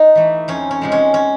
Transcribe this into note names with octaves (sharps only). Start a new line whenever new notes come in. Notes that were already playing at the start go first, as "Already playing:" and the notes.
Already playing: D#4
E3 A3
F2 C#4
C#4
C3 F3 G#3
C#4
C#4